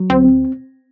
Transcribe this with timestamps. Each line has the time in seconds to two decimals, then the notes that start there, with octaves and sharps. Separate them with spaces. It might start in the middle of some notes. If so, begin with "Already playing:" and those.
Already playing: F#3
0.10 D2 C4
0.25 C4